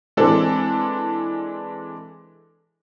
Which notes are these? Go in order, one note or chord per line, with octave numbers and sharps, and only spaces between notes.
E3 G#3 C4 D4 A4